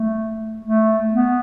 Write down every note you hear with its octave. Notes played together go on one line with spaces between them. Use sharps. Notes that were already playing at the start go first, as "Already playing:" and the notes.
Already playing: A3
A3
B3